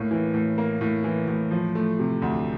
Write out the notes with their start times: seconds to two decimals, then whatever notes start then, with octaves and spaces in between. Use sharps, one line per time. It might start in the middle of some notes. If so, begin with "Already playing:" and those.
Already playing: A2 A#3
0.11 E3
0.34 A2
0.58 A#3
0.81 A2
1.04 E3
1.28 A2
1.51 F3
1.75 A3
1.99 C3
2.22 D2